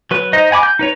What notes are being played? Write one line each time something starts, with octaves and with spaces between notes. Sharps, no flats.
F#3 B4
D#4 C5 D#5
F#5 G#5 B5 D6
G6
D#4 B4 C#5